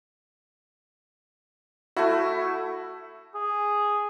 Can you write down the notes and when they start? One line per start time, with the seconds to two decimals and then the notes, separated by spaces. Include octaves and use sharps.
1.97 A3 E4 F#4
3.35 G#4